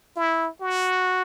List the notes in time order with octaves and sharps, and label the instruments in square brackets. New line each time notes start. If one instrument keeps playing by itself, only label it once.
[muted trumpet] E4
F#4